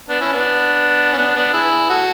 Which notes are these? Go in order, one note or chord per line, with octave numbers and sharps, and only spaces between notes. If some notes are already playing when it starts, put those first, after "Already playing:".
B3 D4
C#4 E4
B3 D4
C#4
B3 D4
B3 D4
E4 G#4
F#4 A4